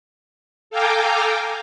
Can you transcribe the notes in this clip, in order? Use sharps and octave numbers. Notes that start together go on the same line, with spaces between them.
A4 F5 G5 G#5 A#5 D6